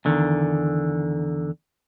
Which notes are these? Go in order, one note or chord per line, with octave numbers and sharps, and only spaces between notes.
E2 D3 D#3